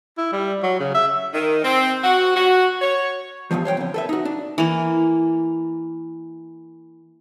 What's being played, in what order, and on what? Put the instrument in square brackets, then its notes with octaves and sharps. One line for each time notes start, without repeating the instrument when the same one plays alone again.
[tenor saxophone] E4
G3
F#3
C#3
E5
[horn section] D#3
C4
F#4
F#4
C#5
[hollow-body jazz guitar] E2 G2 B2 F3
C5 C#5 F#5 G5
F2 D3
A4 B4 E5
D#4 F#4
D4
[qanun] E3 A#3